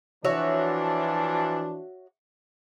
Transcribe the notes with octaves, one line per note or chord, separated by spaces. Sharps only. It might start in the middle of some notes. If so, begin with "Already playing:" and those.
E3 F3 D4 F#4 C#5 E5